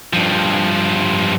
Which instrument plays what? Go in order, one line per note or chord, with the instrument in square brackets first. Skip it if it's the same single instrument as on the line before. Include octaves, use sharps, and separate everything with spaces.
[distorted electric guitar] G2 F3